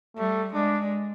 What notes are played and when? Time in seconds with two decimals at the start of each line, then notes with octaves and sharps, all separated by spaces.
0.17 G3 A3
0.54 G#3 D4